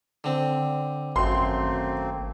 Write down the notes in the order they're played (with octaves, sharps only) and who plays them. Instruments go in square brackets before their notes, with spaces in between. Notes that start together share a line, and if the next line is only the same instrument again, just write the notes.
[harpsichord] D3 C4
[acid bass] G#1 [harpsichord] F#2 [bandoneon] A3 A#3 C4 [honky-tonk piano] C6